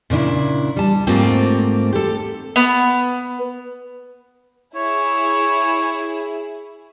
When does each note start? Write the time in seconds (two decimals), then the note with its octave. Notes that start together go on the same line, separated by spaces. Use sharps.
0.10 A#2 C#3 D4 E4
0.76 G3 A5
1.07 G#2 A3 A#3 C4 F4 G4
1.93 G4 A4
2.56 B3
4.75 E4 G#4 C#5